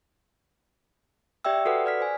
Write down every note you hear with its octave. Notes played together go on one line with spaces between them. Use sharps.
G4 D5 E5 G5 E6
F#4 A4 B4 F#5
D5 F6 B6
C5 G#5